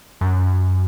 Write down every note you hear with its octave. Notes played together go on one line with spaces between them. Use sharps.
F#2